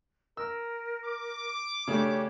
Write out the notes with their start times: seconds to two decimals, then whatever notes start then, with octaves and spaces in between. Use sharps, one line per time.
0.37 A#4 E6
1.05 D6
1.88 C#3 A3 D4 G4 C#5